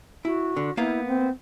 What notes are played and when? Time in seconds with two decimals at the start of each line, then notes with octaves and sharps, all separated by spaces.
0.25 E4 F#4
0.57 D3
0.77 A#3 B3 E4 F5
1.07 C4